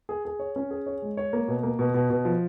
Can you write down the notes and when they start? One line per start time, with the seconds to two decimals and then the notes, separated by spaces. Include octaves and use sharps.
0.09 G#4
0.25 G#4
0.39 C#5
0.56 C#4
0.71 G#4
0.86 C#5
1.02 G#3
1.17 C#5
1.33 A#3
1.48 B2
1.63 A#3
1.79 B2
1.94 B2
2.10 B2
2.25 F3